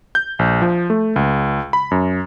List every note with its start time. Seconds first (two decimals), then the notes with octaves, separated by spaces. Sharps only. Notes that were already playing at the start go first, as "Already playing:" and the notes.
0.15 G6
0.39 A#1
0.62 F3
0.90 A3
1.16 C#2
1.73 B5
1.91 F#2